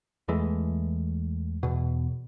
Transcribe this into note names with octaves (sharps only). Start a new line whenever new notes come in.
E2 E3 G#3 A3
E2 B2